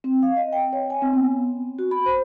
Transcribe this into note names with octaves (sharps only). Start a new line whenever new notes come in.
C4
F5
D#5
G5
C#5
G#5
C4
B3
F#4
B5
C5